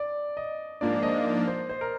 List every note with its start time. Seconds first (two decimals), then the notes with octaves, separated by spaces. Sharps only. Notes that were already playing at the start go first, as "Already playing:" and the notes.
Already playing: D5
0.37 D#5
0.81 G#2 F3 A#3 D4 D5
1.03 D#5
1.48 C5
1.69 C5
1.81 A#4